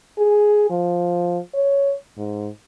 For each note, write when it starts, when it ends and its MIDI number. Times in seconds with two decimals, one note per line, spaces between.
0.18 0.69 68
0.70 1.39 53
1.54 1.93 73
2.17 2.48 44